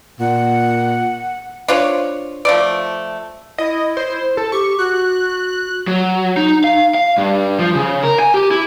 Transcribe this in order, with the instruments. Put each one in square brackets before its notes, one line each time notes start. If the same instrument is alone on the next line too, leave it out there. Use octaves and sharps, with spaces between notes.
[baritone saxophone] A#2 [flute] F#5
[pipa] D4 F4 C5 C#5
F3 A3 D5
[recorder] E4 [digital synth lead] D#5
[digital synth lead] C5
A4
[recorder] G4 [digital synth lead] C#6
[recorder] F#4 [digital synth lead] F#6
[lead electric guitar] F#3
D#4
F5
F5
G2
F3
C#3
A#4
G#5
G4
E4